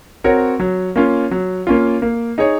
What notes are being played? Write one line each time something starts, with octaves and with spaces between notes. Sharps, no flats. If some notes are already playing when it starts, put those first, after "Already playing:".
C4 F#4 A#4 C#5
F#3
A#3 C#4 F4
F#3
A#3 C#4 F4
A#3
D#4 G#4 C#5